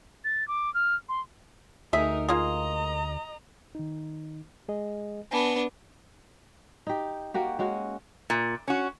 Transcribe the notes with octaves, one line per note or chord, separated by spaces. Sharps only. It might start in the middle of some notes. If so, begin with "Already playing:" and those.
A6
D6
F6
C6
D2 D#4 G#4 A#4 E5
A#3 F4 G#4 D#5 A#5
D#3 D#4
G#3 G#4 D#5
B3 D4 G#5 A5 B5
D#4 G4
A#3 F#4 G4
G#3 C#4 F#4
A#2
C#4 F#4